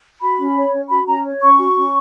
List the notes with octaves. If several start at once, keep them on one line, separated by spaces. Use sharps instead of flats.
F#4 B5
C#4
C#5
C#4
F#4 B5
C#4 A#5
C#5
C#4 C#6
F#4
C#4